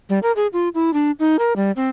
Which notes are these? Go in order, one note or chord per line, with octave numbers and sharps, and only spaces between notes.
G3
A#4
G#4
F4
E4
D4
D#4
A#4
G3
C4